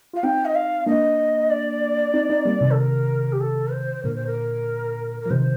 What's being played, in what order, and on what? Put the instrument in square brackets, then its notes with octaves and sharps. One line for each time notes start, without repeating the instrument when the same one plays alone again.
[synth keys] F4 [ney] F5
[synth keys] C4 D#4 [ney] G5
[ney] D#5
F5
[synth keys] A#3 D4 [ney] D#5
[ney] D5
[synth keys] C4 D#4
C4 D#4
G3 A#3
C3 D#3
[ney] A4
A#4
G4
A4
C5
[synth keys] A#2 D3 [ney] A#4
[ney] C5
A#4
A#4
[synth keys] F3
[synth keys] C3 D#3 [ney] C5